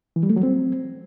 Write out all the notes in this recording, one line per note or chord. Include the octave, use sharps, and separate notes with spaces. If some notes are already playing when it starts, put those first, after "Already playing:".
E3
G3
A3
F#3
C4